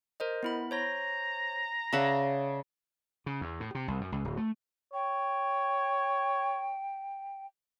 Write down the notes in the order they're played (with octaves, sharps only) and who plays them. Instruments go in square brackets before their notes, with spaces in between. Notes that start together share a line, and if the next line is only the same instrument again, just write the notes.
[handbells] A#4 C5 D#5
B3 E4 B5
[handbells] C5 C#5 A#6 [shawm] A#5
[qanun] C#3 E5 F#5 [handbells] D5 A5
[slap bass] C#3
E2
A2
C3
C2
F#2
C#2
D1
A3
[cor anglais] C#5 [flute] G5